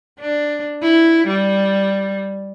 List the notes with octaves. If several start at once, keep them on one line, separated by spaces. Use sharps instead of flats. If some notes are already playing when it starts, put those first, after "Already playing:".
D4
E4
G3